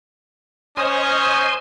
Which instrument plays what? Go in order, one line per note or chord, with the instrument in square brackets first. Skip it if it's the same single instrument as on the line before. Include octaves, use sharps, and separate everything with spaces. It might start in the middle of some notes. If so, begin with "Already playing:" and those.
[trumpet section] C#4 [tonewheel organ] C5 D#5 G#5 [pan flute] D#6